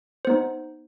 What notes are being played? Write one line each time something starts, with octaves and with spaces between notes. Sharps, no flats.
B3 D#4 C5